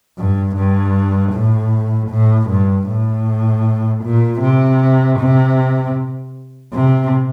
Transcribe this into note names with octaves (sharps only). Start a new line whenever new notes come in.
G2
G2
A2
A2
G2
A2
A#2
C3
C3
C3